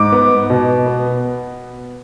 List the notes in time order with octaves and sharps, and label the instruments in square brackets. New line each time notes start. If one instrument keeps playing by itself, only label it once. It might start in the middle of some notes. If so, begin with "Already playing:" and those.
Already playing: [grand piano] G#2 D6
B3
B2
B3